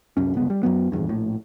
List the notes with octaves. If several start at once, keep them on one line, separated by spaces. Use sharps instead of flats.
C2 F#2 C#4
G1 C#2 B3
G3
F#2 F#3 B3
D#1 A1 E2 G2
A#1 A2